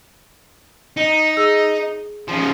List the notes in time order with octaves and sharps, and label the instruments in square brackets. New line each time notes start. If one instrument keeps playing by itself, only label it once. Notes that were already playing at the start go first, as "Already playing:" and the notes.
[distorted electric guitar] D#4
[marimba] G#4 E6
[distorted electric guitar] C#3 F3